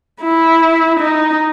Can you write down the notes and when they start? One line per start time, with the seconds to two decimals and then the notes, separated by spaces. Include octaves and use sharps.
0.22 E4
1.00 D#4